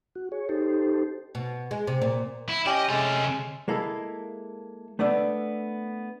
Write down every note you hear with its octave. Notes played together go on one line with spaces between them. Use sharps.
F#4
G#4 C#5
D#4 G4 A4 C5
B2
G#3
C3
A#2
E4
C#4 G4 D5 D#5 G5
C3 G#3 C#4 A4
G#3 A#3 E4 A4
A3 B3 D4 E5